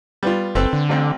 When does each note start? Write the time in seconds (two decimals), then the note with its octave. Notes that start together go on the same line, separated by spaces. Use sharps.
0.23 G3 B3 F4
0.55 F#1 C4 A4 B4
0.73 D3
0.89 A1 C4 G5